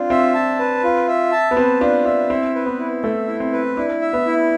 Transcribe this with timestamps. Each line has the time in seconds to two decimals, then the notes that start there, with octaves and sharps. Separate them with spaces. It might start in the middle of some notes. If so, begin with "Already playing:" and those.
Already playing: C4 D4 F4
0.10 C4 E5
0.34 A5
0.59 B4
0.84 F4
1.08 E5
1.32 A5
1.51 B3
1.57 C4 B4
1.81 D4 F4
2.05 D4 E5
2.30 C4 E4
2.55 B4
2.66 B3
2.79 E4
3.03 A3 E5
3.28 E4
3.40 C4
3.53 B4
3.77 D4 E4
4.02 E5
4.13 B3
4.26 E4